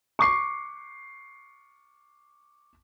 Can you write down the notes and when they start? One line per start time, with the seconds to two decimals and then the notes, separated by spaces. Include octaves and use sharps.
0.19 C#6 D6 C7